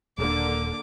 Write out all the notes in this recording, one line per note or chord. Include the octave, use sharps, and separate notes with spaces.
D#1 D3 A#3 D6